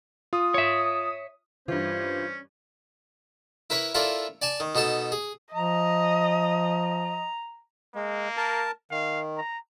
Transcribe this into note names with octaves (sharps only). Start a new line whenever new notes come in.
F4 D#6
C#5 E5
G2 E3 C#4 F4 C5
E4 A#4 B4 C#5
E4 F4 A4 A#4 C#5 D5
D5 G#5 A5
D#3
B2 D#4 A4 A5
G#4
F3 D#5 A#5
G#3 A#3
A#4 A5
D#3 F5
A#5